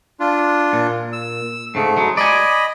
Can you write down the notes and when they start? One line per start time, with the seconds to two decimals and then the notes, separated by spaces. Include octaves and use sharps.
0.20 D4 F4
0.73 A#2
1.13 E6
1.75 G#2 C#3 A3
1.97 F#3 G#3
2.17 D5 D#5 G#5 B5